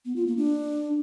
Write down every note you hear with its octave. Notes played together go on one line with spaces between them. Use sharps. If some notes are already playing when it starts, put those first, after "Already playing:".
B3
F4
A#3
D4